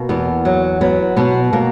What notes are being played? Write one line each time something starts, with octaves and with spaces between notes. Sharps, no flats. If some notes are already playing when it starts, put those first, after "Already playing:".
Already playing: B2 A#3
E2 B3
F#3
F#3 B3
B2 B3
B2 A#3